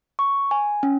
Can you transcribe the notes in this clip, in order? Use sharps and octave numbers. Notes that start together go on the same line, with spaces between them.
C#6
G#5
C#4